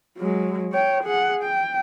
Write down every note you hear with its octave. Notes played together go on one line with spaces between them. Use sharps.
F#3 G#3
C#5 G5
G#4 F#5
G5